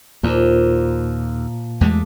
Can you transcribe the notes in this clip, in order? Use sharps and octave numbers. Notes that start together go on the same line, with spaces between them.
D#2 A#2 F3 A#3
E2 G#3 A3 G4 A4